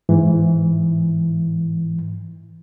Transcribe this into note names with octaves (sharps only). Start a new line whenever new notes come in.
G#2 E3